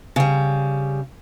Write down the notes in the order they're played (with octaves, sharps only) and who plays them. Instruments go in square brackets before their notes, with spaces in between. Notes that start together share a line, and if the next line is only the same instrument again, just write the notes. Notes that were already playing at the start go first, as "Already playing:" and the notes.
[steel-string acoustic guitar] C#3 G3